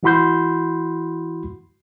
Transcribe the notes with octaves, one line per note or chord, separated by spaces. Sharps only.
E3 E4 F#4 B5 C6 G6